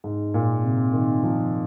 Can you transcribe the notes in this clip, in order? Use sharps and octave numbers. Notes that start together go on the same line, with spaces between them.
G#2
A#2
C3
D#3
F3